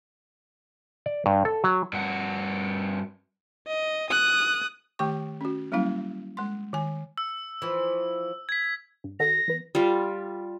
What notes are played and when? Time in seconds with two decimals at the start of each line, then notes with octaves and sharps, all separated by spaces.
1.06 D5
1.26 G2
1.45 A4
1.64 F#3
1.93 G2 F#4
3.67 D#5
4.10 D#6 F#6
4.99 D#3 A3 G4 G5 C#6
5.41 C#4 F#4
5.72 F#3 G3 A#3 C#4 E4 F5
6.37 G#3 C6
6.73 D#3 G#5
7.18 E6
7.62 E3 F3
8.49 G#6 B6
9.04 G2
9.20 D#3 F#4 A4 A#6
9.48 E3 B3
9.75 G3 F4